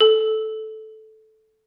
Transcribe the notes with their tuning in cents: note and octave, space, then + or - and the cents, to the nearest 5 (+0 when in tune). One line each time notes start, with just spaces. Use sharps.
A4 -10